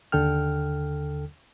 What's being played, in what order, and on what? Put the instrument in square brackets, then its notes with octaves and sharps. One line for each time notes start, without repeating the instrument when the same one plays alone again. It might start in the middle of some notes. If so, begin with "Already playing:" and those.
[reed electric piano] D#2 D3 A4 G5 F6